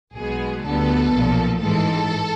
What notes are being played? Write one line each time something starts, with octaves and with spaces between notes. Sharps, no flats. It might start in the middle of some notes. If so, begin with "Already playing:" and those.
B1 B2 G#3 B3 G#4
D2 D3 G3 B3 A4
B1 A#2 F3
A1 G#2 E3 G#3 A4